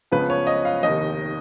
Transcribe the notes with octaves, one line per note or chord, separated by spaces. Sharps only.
C#2 C#3 F3 B3 B4
C#5
D#5
F5
F1 D#2 D#3 D#5